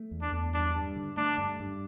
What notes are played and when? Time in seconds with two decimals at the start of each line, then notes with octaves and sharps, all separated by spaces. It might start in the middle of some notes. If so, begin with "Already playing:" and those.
Already playing: A3
0.11 E2
0.22 D4
0.32 E2
0.54 G2 D4
0.75 G2
0.96 D3
1.17 A3 D4
1.38 G2
1.60 G2